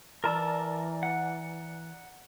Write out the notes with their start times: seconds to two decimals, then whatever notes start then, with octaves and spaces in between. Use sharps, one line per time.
0.24 E3 A#4 D5 A5 A#5 E6 F6
1.03 F#5